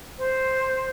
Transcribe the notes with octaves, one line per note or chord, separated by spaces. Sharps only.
C5